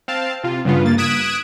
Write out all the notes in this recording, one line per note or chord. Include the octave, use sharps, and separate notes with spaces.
C4 F5 A5
C3 F4
G2 C#3 B3 F4
G2 A#3 A6
D#6 F#6 G#6 B6 D7 E7